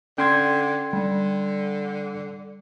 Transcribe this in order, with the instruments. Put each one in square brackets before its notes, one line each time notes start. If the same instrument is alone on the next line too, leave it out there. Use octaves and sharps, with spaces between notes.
[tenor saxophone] D3 [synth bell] C#4 [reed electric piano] G5 C6 G#6
[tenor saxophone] D3 [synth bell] G3